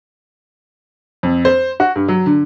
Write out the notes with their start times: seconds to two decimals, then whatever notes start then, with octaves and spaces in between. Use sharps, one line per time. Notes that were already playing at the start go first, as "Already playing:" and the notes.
1.23 F2
1.45 C5
1.80 F#4
1.96 G2
2.08 F#3
2.26 D3